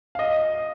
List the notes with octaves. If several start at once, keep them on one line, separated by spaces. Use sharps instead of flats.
F5
D#5